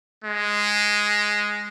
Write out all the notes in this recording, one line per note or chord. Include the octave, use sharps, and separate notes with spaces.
G#3